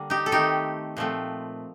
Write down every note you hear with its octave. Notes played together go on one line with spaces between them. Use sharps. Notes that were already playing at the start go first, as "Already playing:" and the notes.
Already playing: D3 G3 A#3
D#4 G4
A4
D#3 A3 C4 D#4 G4
A#2 F3 A3 C4